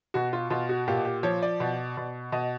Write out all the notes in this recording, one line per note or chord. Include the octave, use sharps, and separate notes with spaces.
B2 F#4
F4
B2 F4
F#4
A#2 G4
G4
F3 C#5
D5
B2
B2
B2 D#5